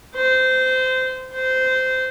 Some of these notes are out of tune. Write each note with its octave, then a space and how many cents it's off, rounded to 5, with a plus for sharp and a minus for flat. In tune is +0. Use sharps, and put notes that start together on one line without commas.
C5 -20
C5 -15